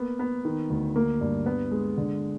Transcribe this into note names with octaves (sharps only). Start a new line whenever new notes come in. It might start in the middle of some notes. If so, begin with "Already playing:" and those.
Already playing: A#3 B3
B3
D#3
D2
A#3
G2
B3
G#3
D3